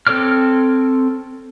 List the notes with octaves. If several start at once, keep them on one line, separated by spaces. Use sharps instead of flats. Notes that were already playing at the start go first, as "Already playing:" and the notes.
C4 A4 C#5 D6 F6